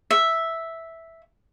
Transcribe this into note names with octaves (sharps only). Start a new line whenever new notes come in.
E5